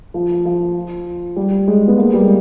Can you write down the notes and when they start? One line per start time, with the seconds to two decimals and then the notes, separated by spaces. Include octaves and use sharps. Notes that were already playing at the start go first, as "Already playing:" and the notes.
0.14 F3
0.45 F3
1.36 G3
1.68 G#3
1.88 B3
1.98 A#3
2.13 G3
2.21 G#3